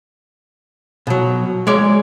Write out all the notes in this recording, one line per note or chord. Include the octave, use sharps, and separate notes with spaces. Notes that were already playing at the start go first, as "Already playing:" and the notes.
B2 F#3
G#3 C#5 D5